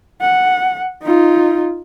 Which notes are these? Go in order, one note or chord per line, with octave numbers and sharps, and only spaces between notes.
F#5
D#4 F4